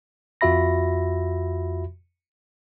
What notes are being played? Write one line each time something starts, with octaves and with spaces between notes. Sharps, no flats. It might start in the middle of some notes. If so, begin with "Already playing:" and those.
F2 F4 F#4 E5 B5 A#6